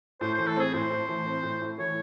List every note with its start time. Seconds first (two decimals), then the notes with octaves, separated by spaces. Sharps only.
0.21 A2 C5
0.34 E3 C5
0.47 A4
0.56 C4 G#4
0.73 A2 C5
0.90 A2
1.08 E3
1.25 C4
1.43 A2
1.61 A2
1.78 E3 C#5